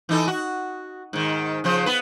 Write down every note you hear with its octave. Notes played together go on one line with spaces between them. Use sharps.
E3 D#4 A4
F#4
G#2 D#3
C#3 F3 C5
B3 B4